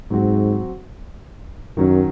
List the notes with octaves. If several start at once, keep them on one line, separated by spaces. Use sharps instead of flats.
G#2 F#3 C4 F#4
F#2 D#3 F#3 C#4